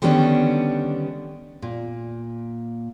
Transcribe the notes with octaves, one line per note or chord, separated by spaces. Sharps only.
D3 D#3 G3 B3 C#4 D4
A#2